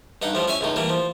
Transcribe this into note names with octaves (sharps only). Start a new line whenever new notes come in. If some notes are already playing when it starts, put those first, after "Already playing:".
G2 D#4 F#5
A2 F3 G3
C#4 C#5 E5 G#5
C#2 A2 D#4
E3 G3 A3 A#3
F3